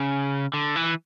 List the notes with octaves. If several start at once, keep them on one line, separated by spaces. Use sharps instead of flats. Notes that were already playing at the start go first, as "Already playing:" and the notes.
Already playing: C#3
D3
E3